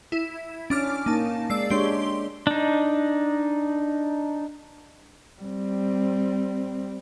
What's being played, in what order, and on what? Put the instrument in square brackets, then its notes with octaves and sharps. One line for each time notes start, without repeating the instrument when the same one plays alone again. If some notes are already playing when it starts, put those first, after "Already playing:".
[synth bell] E4
[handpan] C#4 [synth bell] D4 D6 F6
[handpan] A#3 [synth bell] D#4 A5
[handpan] G#3 [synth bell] D5 E6 C7
[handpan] G#3 D4 C#5 [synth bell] G4 C6 G7
[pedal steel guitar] D4 D#4
[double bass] G3 C4